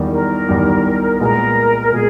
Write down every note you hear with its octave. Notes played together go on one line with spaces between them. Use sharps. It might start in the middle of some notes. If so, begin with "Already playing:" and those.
Already playing: E2 D#3 G3
A#4
E2 D#3 G3
A#2 G#3 B3 A#4
A#2 G#3 B3 G#4